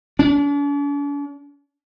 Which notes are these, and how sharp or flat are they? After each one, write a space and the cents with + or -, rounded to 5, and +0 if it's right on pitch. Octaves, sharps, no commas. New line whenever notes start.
D4 -45